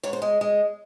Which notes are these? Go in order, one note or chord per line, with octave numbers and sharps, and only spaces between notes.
G#2 C#5
C5
G#3
G#3